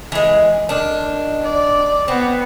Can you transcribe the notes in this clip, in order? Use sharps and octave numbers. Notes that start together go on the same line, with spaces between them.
E3 G#3
D#3 D4
D5
B3 C4